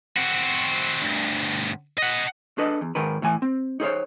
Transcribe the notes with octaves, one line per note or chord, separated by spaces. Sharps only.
C4 F#4
D2 G2
D#5 F#5
D4 G#4 A4 B4 D#5
E2
G#2 D#3 G#4 A#4 B4
A2 E3 G#5
C4
D#4 G#4 C5 C#5